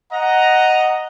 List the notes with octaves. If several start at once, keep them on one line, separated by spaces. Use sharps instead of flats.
D#5 F#5 A#5